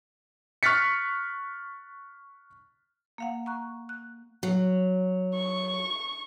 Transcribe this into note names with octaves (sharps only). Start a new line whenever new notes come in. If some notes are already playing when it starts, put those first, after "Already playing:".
C#6 F6 F#6 A6 B6 C#7
A#3 F5 F#5
A#5 C#6 F#6
F#6
F#3
C#6